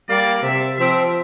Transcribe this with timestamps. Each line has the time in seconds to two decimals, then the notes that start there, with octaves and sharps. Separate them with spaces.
0.09 G3 A#3 D5
0.43 C3 E5
0.78 F3 C4 E5